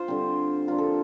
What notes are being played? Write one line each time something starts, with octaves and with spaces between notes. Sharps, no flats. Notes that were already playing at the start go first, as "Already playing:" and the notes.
Already playing: F4 C5
D3 G3 C4
D3 F3 A#3 D4 F4
A4